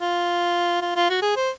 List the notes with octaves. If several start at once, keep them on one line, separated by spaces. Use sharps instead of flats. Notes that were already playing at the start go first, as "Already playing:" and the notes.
F4
F4
F4
F#4
G#4
C5